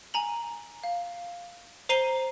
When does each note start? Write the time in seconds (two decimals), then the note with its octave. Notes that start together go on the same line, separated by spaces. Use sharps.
0.14 G#5 A#5 F#7
0.83 F5
1.89 C5 A#5 C7 D#7 G7